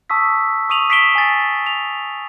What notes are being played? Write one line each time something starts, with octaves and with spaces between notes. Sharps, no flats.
A5 C#6 D#6 E6 B6
C#6 D#6 D#7 F7 F#7
D#6 B6 C7 D7 E7 G7
G#5 A6
F7